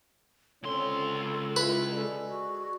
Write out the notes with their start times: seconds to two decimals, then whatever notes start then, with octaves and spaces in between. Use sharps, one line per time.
0.63 C#2 D3 C4 C#4 A4 C6
1.56 G#3 E4 F4 B4
1.94 G#3 G#4 A4 D5
2.27 F#4